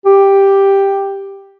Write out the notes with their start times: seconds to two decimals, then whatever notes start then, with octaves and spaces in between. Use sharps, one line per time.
0.06 G4